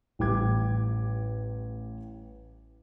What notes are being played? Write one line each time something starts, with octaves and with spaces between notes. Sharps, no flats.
A1 G3 G5 D6 G#6